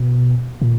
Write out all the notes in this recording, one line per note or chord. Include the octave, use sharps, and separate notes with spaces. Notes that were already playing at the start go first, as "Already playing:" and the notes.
Already playing: B2
A#2